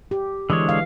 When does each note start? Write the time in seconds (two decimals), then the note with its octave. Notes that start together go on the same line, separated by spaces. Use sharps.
0.11 G4
0.50 D3 E3 G#3 C#5
0.69 F5